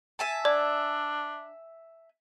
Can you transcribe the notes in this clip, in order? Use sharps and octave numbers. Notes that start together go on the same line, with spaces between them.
E5 G#5 A5
D4 D5